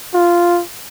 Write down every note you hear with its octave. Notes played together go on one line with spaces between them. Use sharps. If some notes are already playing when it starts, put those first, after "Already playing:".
F4